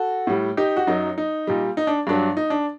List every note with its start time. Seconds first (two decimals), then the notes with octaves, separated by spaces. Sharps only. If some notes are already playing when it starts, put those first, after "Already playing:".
Already playing: F#4 A4
0.27 A2 G3
0.57 D#4 G4
0.77 F#4
0.87 F#2 F#3 D#4
1.18 D#4
1.47 A#2 G3
1.77 D#4
1.87 D4
2.07 G2 F#3 D4
2.37 D#4
2.50 D4